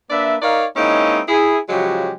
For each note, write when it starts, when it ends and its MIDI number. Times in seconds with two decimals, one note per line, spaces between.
0.10 0.36 58
0.10 0.36 62
0.10 0.36 71
0.10 0.36 74
0.10 0.36 76
0.42 0.66 63
0.42 0.66 70
0.42 0.66 73
0.42 0.66 74
0.42 0.66 77
0.76 1.21 56
0.76 1.21 58
0.76 1.21 60
0.76 1.21 61
0.76 1.21 63
0.76 1.21 64
1.29 1.60 64
1.29 1.60 68
1.69 2.13 49
1.69 2.13 53
1.69 2.13 54
1.69 2.13 56
1.69 2.13 66
1.69 2.13 67